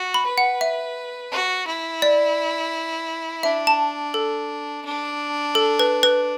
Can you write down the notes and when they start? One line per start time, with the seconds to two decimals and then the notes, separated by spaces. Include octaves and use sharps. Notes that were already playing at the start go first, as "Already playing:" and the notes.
Already playing: F#4
0.14 B5
0.26 B4
0.38 F#5
0.61 E5
1.31 F#4
1.67 E4
2.02 D5
3.43 D4 E5
3.67 A5
4.14 A4
4.85 D4
5.55 A4
5.79 B4
6.03 B4